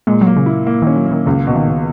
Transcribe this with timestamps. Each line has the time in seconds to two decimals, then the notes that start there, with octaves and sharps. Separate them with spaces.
0.07 A#2 G#3
0.21 F#3
0.27 A#3
0.36 C#3
0.46 E4
0.67 A#3
0.82 D#3
0.87 C#4
0.96 F#3
1.06 A#3
1.11 D#3
1.26 C#2 C#3
1.47 B2
1.56 D#3
1.67 B2